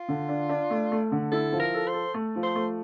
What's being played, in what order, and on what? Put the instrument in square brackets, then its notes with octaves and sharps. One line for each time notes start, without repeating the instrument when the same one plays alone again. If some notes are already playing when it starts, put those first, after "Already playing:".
Already playing: [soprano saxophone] F4
[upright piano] D3
D4
D4
A3
A3
D3
[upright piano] E4 [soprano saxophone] A4
[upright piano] F3
[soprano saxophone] A#4
[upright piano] A4
[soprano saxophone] C5
[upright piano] A4
A3
F3
[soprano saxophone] C5
[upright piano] A3